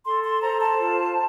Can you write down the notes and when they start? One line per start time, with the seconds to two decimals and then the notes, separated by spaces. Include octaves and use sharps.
0.05 A4 C6
0.23 C6
0.41 C5 A#5
0.60 A5
0.78 F4